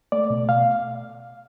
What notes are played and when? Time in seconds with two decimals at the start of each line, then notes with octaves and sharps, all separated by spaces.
0.12 A3 D5
0.30 B2
0.49 B2 F5